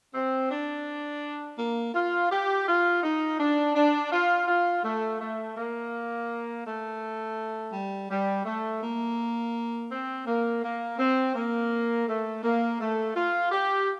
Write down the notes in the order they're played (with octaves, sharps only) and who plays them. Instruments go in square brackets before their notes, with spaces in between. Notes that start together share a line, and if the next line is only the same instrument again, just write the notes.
[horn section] C4
D4
A#3
F4
G4
F4
D#4
D4
D4
F4
F4
A3
A3
A#3
A3
G3
G3
A3
A#3
C4
A#3
A#3
C4
A#3
A3
A#3
A3
F4
G4